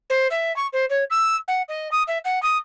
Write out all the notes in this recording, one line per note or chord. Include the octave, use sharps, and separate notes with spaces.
C5
E5
C#6
C5
C#5
E6
F#5
D#5
D#6
E5
F#5
D#6